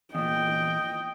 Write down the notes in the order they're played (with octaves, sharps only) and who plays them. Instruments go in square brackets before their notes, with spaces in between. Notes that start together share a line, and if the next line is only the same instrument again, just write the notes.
[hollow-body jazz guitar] E2 A#2 [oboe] D#5 [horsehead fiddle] G5